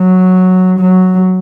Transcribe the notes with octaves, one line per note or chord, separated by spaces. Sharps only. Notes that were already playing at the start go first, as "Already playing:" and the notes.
Already playing: F#3
F#3